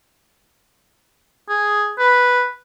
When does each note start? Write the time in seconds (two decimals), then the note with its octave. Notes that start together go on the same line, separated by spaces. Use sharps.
1.49 G#4
1.99 B4